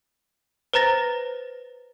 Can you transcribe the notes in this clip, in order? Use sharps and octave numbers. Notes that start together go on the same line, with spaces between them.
B4 C5 A#5 A6 A#6